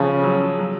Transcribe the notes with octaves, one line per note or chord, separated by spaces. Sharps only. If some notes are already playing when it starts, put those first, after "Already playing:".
Already playing: C#3 F3
F#3
F#3